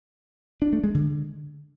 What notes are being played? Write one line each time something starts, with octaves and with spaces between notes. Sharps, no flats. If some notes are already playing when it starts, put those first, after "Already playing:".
D4
A3
G#3
D3